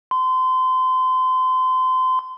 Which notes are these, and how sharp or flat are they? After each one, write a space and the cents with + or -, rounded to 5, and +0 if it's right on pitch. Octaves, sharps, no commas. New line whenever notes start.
C6 -30